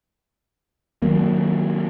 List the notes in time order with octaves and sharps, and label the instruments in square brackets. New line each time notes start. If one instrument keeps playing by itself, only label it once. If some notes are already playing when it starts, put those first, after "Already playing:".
[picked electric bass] D#3 E3 F#3 A#3